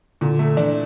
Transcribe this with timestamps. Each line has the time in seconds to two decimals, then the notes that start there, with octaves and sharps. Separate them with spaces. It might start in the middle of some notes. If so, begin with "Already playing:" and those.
0.21 A#2 D3
0.39 A3
0.57 E3 D4